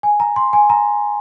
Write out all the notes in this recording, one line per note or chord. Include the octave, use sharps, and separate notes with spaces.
G#5
A#5
C6
G#5
A#5